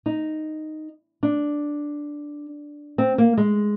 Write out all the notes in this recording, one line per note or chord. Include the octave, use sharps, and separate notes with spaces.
D#4
D4
C4
A#3
G#3